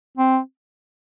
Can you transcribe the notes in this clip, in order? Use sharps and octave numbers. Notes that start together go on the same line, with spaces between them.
C4